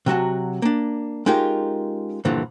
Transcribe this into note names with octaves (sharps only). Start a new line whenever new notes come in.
C3 F#3 F#4 A5
A#3 D4
G#3 C#4 D#4 F4 G4 A#4
G2 A#2 D3 E3 F3